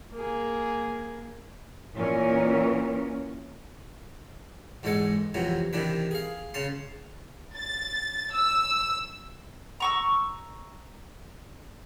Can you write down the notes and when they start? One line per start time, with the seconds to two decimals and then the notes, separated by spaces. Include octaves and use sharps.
0.13 A#3 G#4
1.94 A#2 E3 A#3 B3 C#4 A#4
4.83 E2 G#2 G#3 A4 F#5 G#5
5.34 F2 C3 E3 F#3
5.73 C3 D#3 E3 D4 B4
6.11 G#4 F5
6.54 C#3 C#4 A5 C6
7.55 A6
8.33 E6
9.80 A#5 C#6 E6